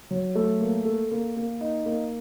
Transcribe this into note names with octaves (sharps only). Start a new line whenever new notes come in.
F#3
A3
A#3
A4
A#3
A#3
D#4
A#3